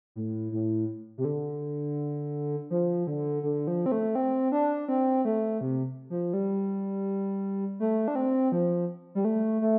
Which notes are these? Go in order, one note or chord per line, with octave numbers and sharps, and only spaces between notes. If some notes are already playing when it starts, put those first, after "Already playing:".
A2
A2
C3
D3
F3
D3
D3
F3
C4
A3
C4
D4
C4
A3
C3
F3
G3
A3
D4
C4
F3
G3
A3
A3